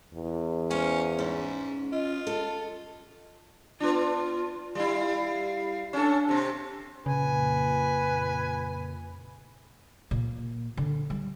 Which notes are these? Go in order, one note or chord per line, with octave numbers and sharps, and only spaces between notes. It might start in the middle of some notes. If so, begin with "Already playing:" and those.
E2
C#4 C5 F5
G#2 C#4
F4 D#5
A4
B3 D4 F4
G3 E4 F5
C#4 D4 A4
C3 C4
F2 A#2 C#3 B4 G#5
A#2 A#3
D3
G3